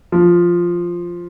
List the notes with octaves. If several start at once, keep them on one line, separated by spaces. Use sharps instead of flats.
F3